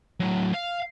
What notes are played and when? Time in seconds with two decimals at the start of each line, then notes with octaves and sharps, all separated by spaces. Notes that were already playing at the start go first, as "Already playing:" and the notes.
0.20 A2 F#3
0.54 F5